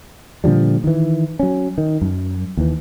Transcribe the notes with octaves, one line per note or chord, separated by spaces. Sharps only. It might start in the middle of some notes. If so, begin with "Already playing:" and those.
A#2 D3 F3 G3
D#3 E3
F#3 C#4
D#3
F#2
D#2 E3